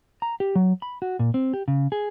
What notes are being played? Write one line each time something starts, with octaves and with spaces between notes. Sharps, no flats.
A#5
G4
F#3
B5
F#4
A#2
C4
G4
C#3
G#4